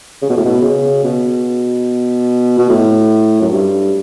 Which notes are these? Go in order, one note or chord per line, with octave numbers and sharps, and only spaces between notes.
C#3
B2
A2
B2
C#3
B2
B2
A2
F#2
G2